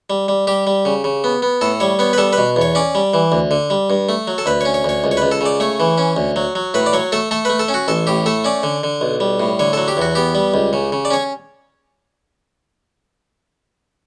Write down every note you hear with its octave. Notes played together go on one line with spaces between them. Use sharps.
G3
G3
G3 G4
G3
C#3
C#3
B3
B3
A2 A4
G3 C#5
B3 C#5
B4
G3 A4
B2 B4
E2
C#5
C#4 D5
G3
E3
D2
D3
G3
G2
A3
F#3
A4
D2 B4
C#4 C#5
C#5
D2 C#5
C#2
C#5
C#2 B4
A4
C#3 D5
A3 C#5
E3
C#4
D2
F#3
F#3
A2 B4
D5
F#3 C#5
A3 A4
A3 A4
A3 B4
A4
C#4
F#4
A1 A4
A2 G4
A3 A4
C#4 D5
D3
D3
B1
G3
A2
D3 C#5
F#3 A4
G4
E2 F#4
B3 G4
G3
C#2
C#3
C#3
D5
C#4 C#5